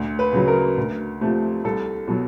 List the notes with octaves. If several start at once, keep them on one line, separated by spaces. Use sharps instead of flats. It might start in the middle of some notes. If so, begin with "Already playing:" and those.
Already playing: D2
B4
C#3 F#3
A#4
D2
C3 F3 A3
C2 A4
B2 F#3